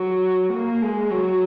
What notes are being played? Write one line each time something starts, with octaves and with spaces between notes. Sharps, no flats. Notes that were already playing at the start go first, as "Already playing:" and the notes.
Already playing: F#3
A#3
G#3
F#3